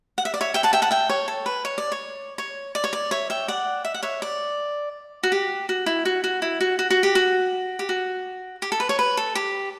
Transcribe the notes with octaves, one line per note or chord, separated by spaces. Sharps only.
F#5
E5
D5
C#5 E5
E5 G5
F#5 A5
E5 G5
F#5 A5
E5 G5
C#5
A4
B4
C#5
D5
C#5
C#5
D5
C#5
D5
C#5 E5
E5 G5
D5 F#5
E5
F#5
C#5 E5
D5
F#4
G4
F#4
E4
F#4
F#4
E4
F#4
F#4
F#4
G4
F#4
G4
F#4
G4
A4
B4
C#5
B4
A4
G4